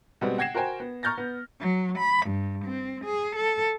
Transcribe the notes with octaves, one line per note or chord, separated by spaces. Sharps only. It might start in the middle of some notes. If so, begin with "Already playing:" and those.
B2 G3 G#3 B3 C4
F#5 G5 G#6 A#6 C7 E7
F#4 A#4 C5 G5 G#5
B3
A#5 C#6 F6 G6 A6 A#6
B3
F#3
B5
G2
C4
G#4
A4